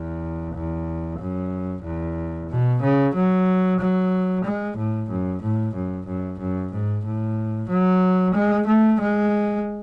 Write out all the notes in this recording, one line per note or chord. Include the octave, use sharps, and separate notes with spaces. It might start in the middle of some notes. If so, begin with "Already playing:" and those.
Already playing: E2
E2
F#2
E2
B2
C#3
F#3
F#3
G#3
A2
F#2
A2
F#2
F#2
F#2
G#2
A2
F#3
G#3
A3
G#3